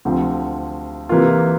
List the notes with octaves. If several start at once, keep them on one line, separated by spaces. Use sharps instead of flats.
D2 C3 F3 C4
C3 E3 A#3 F4